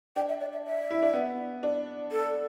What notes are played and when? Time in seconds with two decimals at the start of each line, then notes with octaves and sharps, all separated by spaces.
0.16 D4 G5
0.29 E5
0.40 D5
0.52 E5
0.66 E5
0.90 E4
1.02 D4
1.13 B3
1.63 D4
2.12 A4